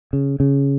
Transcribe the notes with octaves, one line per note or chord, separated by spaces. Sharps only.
C#3
C#3